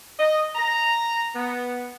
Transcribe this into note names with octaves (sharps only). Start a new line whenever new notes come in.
D#5
A#5
B3